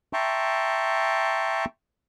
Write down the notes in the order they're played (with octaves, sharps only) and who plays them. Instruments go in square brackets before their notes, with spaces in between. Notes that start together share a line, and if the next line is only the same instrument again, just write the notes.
[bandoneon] E5 G5 A5 A#5 C6 C#6